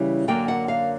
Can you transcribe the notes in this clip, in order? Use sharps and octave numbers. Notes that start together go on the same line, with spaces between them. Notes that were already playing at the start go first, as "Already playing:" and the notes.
Already playing: C#3 E3 G3
F#2 D3 F#3 A#3 G5
F#5
F5